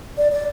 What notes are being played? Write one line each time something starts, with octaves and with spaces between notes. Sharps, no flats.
D5
D5